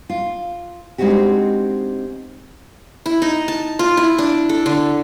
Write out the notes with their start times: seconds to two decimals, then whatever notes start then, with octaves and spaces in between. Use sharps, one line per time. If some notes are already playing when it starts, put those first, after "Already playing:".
0.09 F4
0.98 G#3 C4 D4 D#4 F#4 G4
3.06 E4
3.22 D#4
3.48 A5
3.79 F4
3.97 E4
4.18 D4
4.49 A4
4.66 D3